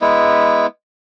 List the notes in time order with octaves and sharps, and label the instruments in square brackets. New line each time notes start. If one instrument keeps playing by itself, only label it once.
[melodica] G#3 B3 E4